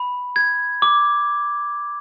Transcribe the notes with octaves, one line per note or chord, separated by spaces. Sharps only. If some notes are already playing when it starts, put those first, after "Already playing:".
Already playing: B5
G#6
D6